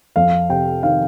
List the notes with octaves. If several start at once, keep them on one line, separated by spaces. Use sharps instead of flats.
F2 F5
C3 G5
D#3 F5